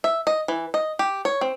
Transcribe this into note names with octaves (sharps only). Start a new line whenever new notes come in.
E5
D#5
E3
D#5
G4
C#5
C4